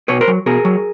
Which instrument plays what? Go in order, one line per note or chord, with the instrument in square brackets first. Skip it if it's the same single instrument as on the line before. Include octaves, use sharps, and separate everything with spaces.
[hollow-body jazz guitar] B2 B4 C#5
A#4 C5
F#3
B2 G#4 A#4
F#3